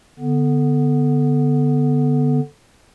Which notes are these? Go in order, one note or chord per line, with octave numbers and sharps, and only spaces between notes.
D3 B3